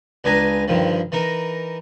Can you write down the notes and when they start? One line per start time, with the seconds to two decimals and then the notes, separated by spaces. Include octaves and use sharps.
0.24 C#2 D4 B4 D#5 G#5 A#5
0.68 G2 D3 D#3 F3
1.12 E3 D#4 A#4